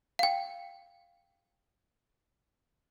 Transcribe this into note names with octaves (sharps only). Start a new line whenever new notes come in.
F5 G5